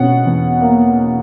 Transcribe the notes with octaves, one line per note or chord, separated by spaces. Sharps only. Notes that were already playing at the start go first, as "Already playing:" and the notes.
Already playing: B2 C#4 F#5
E2
A#3